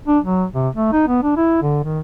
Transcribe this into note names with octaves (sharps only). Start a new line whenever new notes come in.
D4
F#3
C3
A3
D#4
B3
D4
E4
D3
D#3